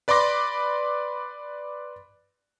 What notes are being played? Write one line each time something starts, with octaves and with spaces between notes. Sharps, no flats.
B4 D5 B5 C6 D6 A#6